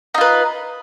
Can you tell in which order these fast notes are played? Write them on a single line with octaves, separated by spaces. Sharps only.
D#4 F4 B4